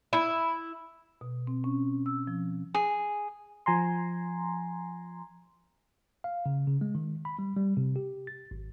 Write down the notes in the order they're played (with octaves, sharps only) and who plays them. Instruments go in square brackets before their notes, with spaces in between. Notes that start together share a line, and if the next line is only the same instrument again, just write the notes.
[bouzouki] E4
[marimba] B2
C4
C#4
E6
F3
[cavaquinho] G#4
[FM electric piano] F3 G#5 A#5 C6
[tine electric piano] F5
C#3
C#3
G#3
D#3
B5
G3
G3
C3
G4
A6
G#1